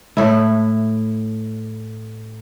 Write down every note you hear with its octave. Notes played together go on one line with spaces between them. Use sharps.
A2 E4